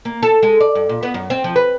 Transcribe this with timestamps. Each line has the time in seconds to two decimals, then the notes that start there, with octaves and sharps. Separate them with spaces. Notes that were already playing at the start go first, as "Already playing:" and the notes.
0.05 A#3
0.23 A4
0.43 G#3
0.60 D5
0.75 G2
0.89 A#2
1.03 B3
1.14 F#2
1.30 C4
1.44 F3
1.56 B4